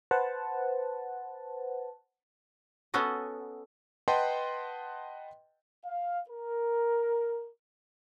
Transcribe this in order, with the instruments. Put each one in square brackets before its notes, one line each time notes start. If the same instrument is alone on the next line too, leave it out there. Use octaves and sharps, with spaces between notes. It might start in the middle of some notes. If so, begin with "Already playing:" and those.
[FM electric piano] B4 C5 F#5 A5
[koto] B3 C#4 F#4 A4 D#5
[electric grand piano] B4 D#5 F#5 G5 A5 C6
[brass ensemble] F5
A#4